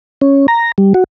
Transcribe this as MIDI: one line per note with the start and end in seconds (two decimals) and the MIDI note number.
0.21 0.47 61
0.48 0.72 82
0.78 0.93 55
0.94 1.04 66